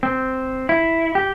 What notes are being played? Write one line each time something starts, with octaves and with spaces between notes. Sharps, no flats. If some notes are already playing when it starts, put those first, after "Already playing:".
C4
E4
G4